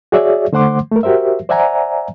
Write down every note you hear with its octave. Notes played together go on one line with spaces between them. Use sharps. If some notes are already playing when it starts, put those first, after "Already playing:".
F#4 G#4 C#5 D5 E5
D3 A3 C5 F#5 C6 D6
A3 A#4
F#4 G4 A#4 C5 E5
C5 D5 E5 F#5 G#5 A#5